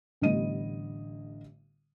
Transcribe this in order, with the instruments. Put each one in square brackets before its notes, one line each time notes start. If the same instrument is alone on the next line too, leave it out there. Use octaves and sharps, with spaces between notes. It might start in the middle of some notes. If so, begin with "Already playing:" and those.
[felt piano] A1 D3 G3 B3 D#5 D#7